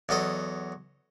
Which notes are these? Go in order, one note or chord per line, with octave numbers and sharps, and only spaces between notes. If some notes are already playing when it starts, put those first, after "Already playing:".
E2 F#3 A4 D#5